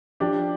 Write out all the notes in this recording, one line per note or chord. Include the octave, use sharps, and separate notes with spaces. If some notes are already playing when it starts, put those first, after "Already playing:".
F3 D4 G4